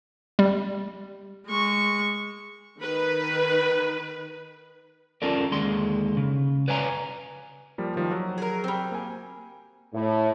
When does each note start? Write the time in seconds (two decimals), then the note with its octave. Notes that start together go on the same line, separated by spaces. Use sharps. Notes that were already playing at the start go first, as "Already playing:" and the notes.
0.39 G3
1.46 G#3 C#6
2.79 D#3 B4
5.22 C#4 F4 A4 A#4 D5
5.51 D#2 D3 G#3 C6
6.17 C#3
6.68 B4 C#5 D5 F5 G#5 A#5
7.78 F3 G3 A#3
7.96 D#3 F3 G3
8.11 F#3
8.38 G#4 A#4
8.64 G3 C4
8.92 A#3 G#5
9.94 A2